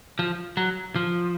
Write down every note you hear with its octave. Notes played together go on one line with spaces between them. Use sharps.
F3
F#3
F3